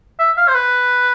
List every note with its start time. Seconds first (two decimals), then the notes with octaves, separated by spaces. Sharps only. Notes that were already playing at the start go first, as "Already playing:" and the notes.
0.19 E5
0.37 F5
0.48 C5
0.55 B4